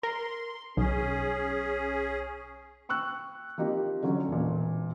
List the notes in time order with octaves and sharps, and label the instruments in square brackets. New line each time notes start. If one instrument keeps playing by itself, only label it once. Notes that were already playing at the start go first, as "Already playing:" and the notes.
[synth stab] A#4 [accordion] C6
[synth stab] B1 [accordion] C#4 G#4
[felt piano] G5 C#6 E6 F#6
F3 A#3 C4 D#4 G4
D3 F#3 C#4
E1 A#2